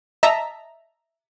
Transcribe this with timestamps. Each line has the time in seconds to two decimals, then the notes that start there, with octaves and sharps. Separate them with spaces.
0.23 D#5 E5 A5 A#5 B6